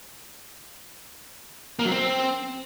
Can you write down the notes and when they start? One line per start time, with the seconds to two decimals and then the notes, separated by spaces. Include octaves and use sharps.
1.79 A#3
1.85 F#3
1.91 C4